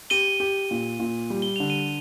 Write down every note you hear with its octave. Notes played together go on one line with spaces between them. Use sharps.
G4 D#7 G7
G4
A#2
A#2
G3
G7
D3 F7
D#7 G7